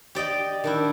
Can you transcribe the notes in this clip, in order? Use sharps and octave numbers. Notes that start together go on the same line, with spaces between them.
G4 D5 D#5 G5
D#3 D4 E4